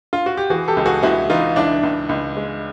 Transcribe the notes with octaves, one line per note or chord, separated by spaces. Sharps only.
F4
F#4
G4
E3 F#4 G#4
G4 A4
C#2
F#4 G#4
C#2 E4 F#4
E3 D#4 F4
C#2 D4 E4
C#2
C#2
G#3